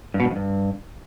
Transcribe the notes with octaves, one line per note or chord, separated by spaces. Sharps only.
G2
B2
G2
F2
G2